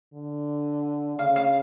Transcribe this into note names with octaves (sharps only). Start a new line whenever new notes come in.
D3
C#3 F5
F5